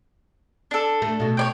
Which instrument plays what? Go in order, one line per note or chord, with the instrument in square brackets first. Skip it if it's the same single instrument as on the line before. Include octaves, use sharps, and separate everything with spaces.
[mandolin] D4 A4
[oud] A3
B2 F#4
[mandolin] C#5 D5 G5